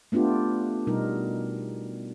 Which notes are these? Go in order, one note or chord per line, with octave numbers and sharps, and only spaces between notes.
A3 B3 D4 F4 G4
B2 G3 D#4 A#4